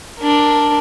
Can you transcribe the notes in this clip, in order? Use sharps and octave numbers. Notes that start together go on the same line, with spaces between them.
D4 A#4